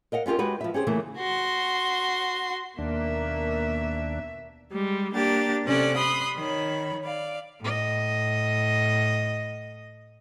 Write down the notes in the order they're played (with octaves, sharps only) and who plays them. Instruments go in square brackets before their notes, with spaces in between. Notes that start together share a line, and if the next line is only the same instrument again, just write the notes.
[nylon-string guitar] A#4 D#5 F5 F#5
B3 C#4 F4 G4 A#4
G#3 F#4 G4 B4
F3 E5
C#4 G4 G#4 C5
C#3 E3 A3 A#3
[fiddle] F#4 C6
[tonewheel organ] D#2 D4 [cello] B2 E5 [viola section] A#3
[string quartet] G3 G#3
A#3 D4 G4 A6
C3 C#4 A4 D5 F#6
B5 C6 D#6 F#6
D#3 C#5 B5
D5 F5
[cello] A2 D#5